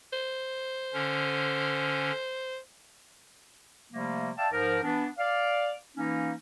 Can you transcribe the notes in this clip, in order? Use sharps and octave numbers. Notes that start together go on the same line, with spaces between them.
C5
D3 C#4
C3 F3 G3 A3 A#3
D5 E5 F5 G5 A5
G#2 F3 A#4
E3 B3 D4
D5 F5
E3 A#3 C#4 D#4